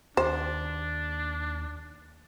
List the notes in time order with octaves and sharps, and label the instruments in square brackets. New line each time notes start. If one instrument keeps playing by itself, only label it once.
[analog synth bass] D#2 [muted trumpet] D4 [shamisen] C5